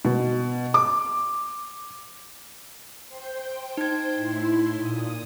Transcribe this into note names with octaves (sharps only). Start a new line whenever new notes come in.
B2
D6
C5 G5
D#4 G#6
A2 E4 C6
A#2 D#6